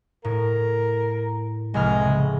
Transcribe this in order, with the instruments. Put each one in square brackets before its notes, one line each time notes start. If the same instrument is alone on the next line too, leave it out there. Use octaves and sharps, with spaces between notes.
[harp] A2 [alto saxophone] A#4
[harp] F1 C2 F6 [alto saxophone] G#3
[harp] C#3